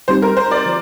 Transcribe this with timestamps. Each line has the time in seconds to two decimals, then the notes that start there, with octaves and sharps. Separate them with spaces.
0.08 G3 C4 D#4 G4 C5
0.22 A#4
0.37 C5
0.51 D5
0.65 F3